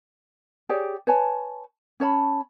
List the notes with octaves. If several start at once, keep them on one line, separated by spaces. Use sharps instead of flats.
G4 G#4 C#5 D5
B4 C#5 G#5 A5
C#4 C#5 A5 B5